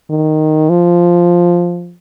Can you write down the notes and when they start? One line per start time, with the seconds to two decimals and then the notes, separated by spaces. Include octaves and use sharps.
0.10 D#3
0.70 F3